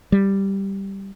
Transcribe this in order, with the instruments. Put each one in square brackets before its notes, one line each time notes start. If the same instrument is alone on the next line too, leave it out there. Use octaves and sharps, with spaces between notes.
[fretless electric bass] G3